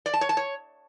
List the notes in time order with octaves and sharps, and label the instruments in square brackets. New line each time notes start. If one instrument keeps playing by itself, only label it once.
[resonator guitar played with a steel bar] D5
A5
C#5
A5
C#5